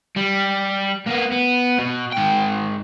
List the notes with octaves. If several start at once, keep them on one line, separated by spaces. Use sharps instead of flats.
G3
A#3 B3
B3
B2
G#2 G5